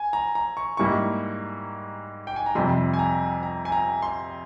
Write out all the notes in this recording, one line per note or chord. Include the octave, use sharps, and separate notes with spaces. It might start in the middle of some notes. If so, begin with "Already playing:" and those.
Already playing: G#5
A#5
A#5
C#6
G#2 G3 A#3 E4 C#6
G5
G#5
A#5
F2 C3 G3 C6
G#5
A#5
A#5
G#5
A#5
C6